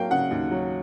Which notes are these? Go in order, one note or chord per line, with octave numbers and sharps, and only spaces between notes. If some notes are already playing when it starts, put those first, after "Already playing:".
Already playing: F#3 A#3 F5 G5
C#3 F#5
D#2
F#3